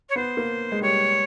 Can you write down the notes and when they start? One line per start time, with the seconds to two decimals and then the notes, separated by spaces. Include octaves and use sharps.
0.09 C#5
0.16 B3 C5
0.37 A#3
0.72 G#3
0.82 G3 C#5